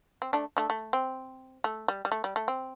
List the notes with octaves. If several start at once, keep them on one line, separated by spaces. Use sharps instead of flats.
C4
A3 D4
A3 D4
A3
C4
A3
G3
G3
A3
G3
A3
C4